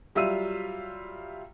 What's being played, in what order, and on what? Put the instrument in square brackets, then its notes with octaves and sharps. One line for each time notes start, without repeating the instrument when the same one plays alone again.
[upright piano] F#3 G3 F4 E5 E6 D#7